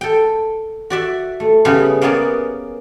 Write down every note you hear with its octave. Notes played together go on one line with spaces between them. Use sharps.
A4 G5
F#4 D5 E5
A3
C#3 G3 B3 C#4 G4
A#3 B3 C#4 G#4 D5